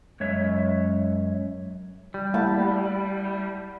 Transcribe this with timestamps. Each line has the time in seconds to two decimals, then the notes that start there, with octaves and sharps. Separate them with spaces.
0.20 F#2 G#3 C#5 E5
2.14 G3
2.34 A3 A#3 E4 F#5 A5